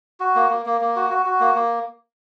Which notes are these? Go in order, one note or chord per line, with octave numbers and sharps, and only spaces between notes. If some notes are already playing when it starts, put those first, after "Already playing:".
F#4
A#3
A#3
A#3
A#3
F#4
F#4
F#4
A#3
A#3